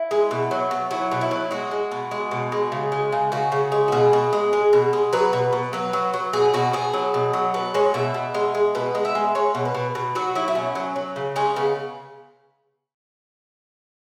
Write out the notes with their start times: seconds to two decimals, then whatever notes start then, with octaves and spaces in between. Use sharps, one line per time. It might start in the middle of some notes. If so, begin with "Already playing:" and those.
Already playing: E4
0.11 G#3
0.31 B2
0.51 F#3
0.71 B2
0.91 F#3 E4
1.12 B2
1.21 E4
1.31 F#3
1.51 G#3 F#4
1.71 G#3
1.91 B2
2.11 G#3
2.31 B2
2.52 G#3
2.72 C#3
2.92 G#3
3.12 C#3
3.32 C#3 F#4
3.52 C#3
3.72 G#3
3.88 F#4
3.92 B2 G#4
4.13 B2
4.33 G#3
4.53 G#3
4.73 B2
4.93 G#3
5.13 F#3 B4
5.33 B2
5.53 B2
5.73 F#3 B4
5.93 F#3
6.14 F#3
6.33 B2 G#4
6.54 B2 F#4
6.73 B2 G#4
6.94 F#3
7.14 B2
7.33 F#3
7.54 B2 B4
7.74 G#3 C#5
7.94 B2 E5
8.14 B2
8.34 G#3
8.55 G#3
8.75 B2 B4
8.95 G#3
9.05 E5
9.15 G#3
9.35 G#3 C#5
9.55 B2
9.65 B4
9.75 B2
9.95 B2
10.15 F#3 F#4
10.35 F#3 E4
10.48 E4
10.55 B2 C#4
10.75 F#3
10.96 F#3
11.16 C#3
11.36 G#3 C#4
11.56 C#3 B3